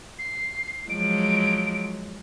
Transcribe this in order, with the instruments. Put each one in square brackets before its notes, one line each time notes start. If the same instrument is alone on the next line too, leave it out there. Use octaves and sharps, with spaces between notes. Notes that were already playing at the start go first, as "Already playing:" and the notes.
[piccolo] C7
[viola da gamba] F3 F#3 G#3 [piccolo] D7